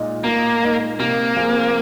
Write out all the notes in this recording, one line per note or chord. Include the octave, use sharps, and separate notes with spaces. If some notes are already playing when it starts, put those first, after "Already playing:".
Already playing: A#2 G#3 D#4
A#2 A#3
G#3 D#4
C3 A#3
F3 C4 F4 G#4